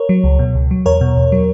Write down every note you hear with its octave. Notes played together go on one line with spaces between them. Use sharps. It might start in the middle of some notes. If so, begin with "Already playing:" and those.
Already playing: A#4 C#5
F#3
C#2
B2
C#2
F#3
E2 A#4 C#5
B2
E2
F#3